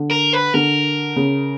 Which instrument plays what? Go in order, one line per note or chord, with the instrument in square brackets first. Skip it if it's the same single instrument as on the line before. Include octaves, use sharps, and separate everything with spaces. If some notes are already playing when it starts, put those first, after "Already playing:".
Already playing: [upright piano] D3
[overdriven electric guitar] A#4
B4
[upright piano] D3 [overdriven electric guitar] A#4
[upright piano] C#3